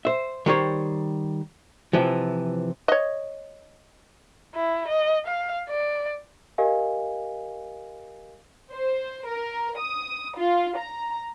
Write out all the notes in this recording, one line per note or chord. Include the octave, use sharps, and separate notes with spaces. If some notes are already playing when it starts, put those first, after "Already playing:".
C5 E5
D#3 G3 C5 C#5
C3 E3 F3
C#5 D#5
E4
D#5
F5
D5
G4 A#4 D#5 F5 G#5
C5
A#4
D#6
F4
A#5